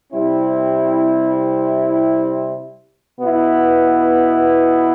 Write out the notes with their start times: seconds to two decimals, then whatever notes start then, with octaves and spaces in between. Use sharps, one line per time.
0.13 C3 G3 C4 E4
3.19 B2 B3 E4